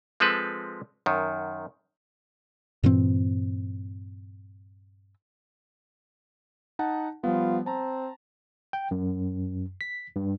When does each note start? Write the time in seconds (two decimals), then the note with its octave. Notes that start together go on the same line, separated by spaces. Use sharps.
0.20 F3 G#3 C4 A4 B4
1.06 F#2 D#3
2.83 G2 A#2 E3 C4
6.79 D#4 F#5 A5
7.24 F3 G3 B3 F4
7.66 C4 A5 A#5
8.73 G5
8.91 F#2
9.81 B6
10.16 G2